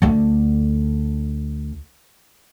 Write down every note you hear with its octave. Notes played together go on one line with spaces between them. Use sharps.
D2 D3